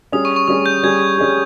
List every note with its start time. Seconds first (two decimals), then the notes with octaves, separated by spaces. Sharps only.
0.12 G3 C#4 G#4 D#6
0.25 C#6
0.36 C#6
0.48 G3 C#4 G#4 D#6
0.66 G6
0.83 G3 C#4 G#4 G#6
1.18 G3 C#4 G#4